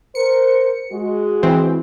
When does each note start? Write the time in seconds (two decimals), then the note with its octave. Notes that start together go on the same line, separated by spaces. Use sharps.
0.15 A#4 C5 C#7
0.92 G#3 F#4
1.43 E3 C4